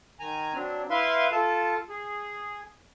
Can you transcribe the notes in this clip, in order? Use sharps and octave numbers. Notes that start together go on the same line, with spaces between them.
D#3 G#5 A#5
F#3 C4 D4
E4 B4 E5 F5 C6
F4 A4 A5
G#4